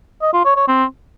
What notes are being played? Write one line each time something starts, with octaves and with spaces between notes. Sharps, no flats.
D#5
F4
C#5
C#5
C4